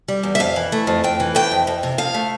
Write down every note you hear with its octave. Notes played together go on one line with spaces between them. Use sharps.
G3
E2
E5
F2 F5
E3
A3
F2
F2 G5
E3
A3 G5
F2
F2
C3
F3 F5
A3